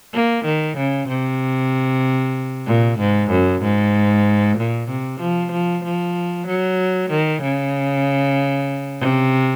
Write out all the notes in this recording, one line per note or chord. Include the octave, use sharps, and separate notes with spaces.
A#3
D#3
C#3
C3
A#2
G#2
F#2
G#2
A#2
C3
F3
F3
F3
F#3
D#3
C#3
C3